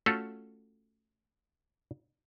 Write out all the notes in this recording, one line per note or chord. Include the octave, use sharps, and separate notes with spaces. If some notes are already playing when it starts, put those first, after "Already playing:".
A3 C#4 F4 F#4 A4